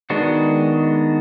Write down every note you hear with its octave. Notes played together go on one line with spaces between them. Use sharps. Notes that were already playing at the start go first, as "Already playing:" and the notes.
D#3 G#3 B3 D4 F#4